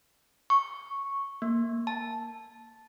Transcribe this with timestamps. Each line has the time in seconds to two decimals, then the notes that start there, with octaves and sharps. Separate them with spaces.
0.50 C#6
1.42 A#3
1.87 A5